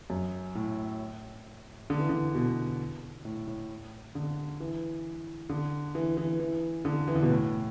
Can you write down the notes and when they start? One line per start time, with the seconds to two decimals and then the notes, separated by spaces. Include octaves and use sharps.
0.10 F#2
0.55 A2
1.90 D3
2.00 E3
2.09 D3
2.35 B2
3.25 A2
3.47 A2
4.15 D3
4.60 E3
5.49 D3
5.95 E3
6.17 E3
6.40 E3
6.85 D3
7.08 E3
7.15 D3
7.22 B2
7.30 A2